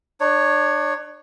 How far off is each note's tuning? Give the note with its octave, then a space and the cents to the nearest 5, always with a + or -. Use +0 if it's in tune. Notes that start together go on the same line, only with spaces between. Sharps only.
D4 +30 C#5 +0